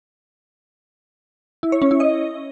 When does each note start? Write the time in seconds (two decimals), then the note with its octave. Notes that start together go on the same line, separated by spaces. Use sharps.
1.63 E4
1.72 C#5
1.82 C#4
1.91 E4
2.00 D#5